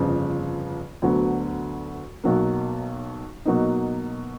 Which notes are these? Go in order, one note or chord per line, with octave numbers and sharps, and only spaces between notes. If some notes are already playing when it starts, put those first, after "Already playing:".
Already playing: G1 F2 C#3 F3
D2 D3 F#3 B3
B1 B2 F#3 A#3
B2 F#3 A#3 D#4